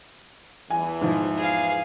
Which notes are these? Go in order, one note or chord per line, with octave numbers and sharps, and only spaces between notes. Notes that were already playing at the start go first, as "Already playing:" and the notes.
E2 E3 G#5
G#2 F3
G#4 F5